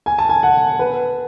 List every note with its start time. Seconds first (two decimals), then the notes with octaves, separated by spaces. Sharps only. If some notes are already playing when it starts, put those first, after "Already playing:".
0.06 G#5
0.18 A5
0.29 G#5
0.43 F#5
0.79 B4